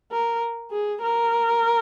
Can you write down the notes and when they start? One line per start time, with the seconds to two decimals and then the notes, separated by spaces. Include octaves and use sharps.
0.12 A#4
0.71 G#4
1.02 A#4